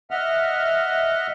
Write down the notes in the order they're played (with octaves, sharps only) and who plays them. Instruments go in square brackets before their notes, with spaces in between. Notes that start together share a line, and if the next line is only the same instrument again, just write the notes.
[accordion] D#5 E5 F#5 F6